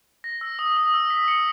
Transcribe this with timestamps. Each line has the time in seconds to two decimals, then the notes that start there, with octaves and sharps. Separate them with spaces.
0.24 A#6
0.41 E6
0.59 D#6
0.77 D#6
0.94 E6
1.10 B6
1.28 C#7